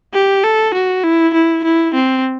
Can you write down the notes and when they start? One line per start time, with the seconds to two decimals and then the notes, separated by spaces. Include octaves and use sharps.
0.14 G4
0.44 A4
0.74 F#4
1.04 E4
1.34 E4
1.64 E4
1.94 C4